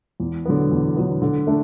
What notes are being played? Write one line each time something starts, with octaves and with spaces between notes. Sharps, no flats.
E2
D3 F#3 B3
E2
D3 F#3 B3
D3
A3 D4